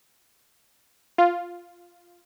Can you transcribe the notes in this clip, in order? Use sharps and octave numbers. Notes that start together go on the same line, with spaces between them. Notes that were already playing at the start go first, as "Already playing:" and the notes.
F4